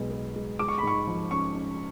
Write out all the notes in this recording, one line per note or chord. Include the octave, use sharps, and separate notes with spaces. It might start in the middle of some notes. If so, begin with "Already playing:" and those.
Already playing: B1 B2 G#3 B3
B3
G#3
G#3 D6
C#6
B5
G#2 C#6
F3
C#4 C#6
C#4